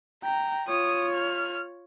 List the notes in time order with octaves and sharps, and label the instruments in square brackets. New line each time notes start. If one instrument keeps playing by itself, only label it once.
[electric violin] G5 [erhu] A#5
[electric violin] F4 C#5 [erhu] D#6
[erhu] F6